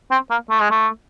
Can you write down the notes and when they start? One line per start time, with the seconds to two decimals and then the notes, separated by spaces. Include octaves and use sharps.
0.11 C4
0.30 A#3
0.50 A3
0.60 G#3
0.71 A3